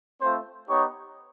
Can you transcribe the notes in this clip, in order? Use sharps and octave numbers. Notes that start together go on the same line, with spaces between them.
A3 C4 F4 C5
B3 D#4 G4 C#5